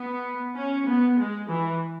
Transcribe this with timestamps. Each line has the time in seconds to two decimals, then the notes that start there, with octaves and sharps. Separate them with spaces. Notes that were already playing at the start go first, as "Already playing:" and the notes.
Already playing: B3
0.55 C#4
0.87 B3
1.19 G#3
1.49 E3